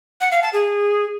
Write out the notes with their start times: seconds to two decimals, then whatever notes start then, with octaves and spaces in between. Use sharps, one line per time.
0.21 F#5
0.32 F5
0.42 A5
0.53 G#4